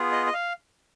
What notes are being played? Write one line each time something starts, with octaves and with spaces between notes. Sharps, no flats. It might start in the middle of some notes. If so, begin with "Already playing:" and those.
Already playing: B3 F4 G#4
D#5
D#5
F5